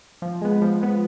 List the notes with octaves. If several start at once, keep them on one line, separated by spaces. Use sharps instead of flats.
F3
G#3 B3
F3
G#3 B3